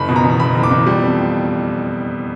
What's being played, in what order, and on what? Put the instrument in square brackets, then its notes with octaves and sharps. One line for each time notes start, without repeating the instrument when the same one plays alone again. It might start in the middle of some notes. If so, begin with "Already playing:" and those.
Already playing: [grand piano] F#1 B5
B2
A#5
E2
F#1 B5
F#1
D6
E2
G3
F2